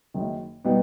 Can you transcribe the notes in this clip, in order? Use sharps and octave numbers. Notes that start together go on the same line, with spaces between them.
F#1 F#2 D#3
B2 G3 B3 D#4